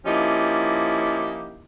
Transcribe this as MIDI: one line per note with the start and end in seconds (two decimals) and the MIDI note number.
0.06 1.65 53
0.06 1.65 58
0.06 1.65 61
0.06 1.65 63
0.06 1.65 64
0.06 1.65 67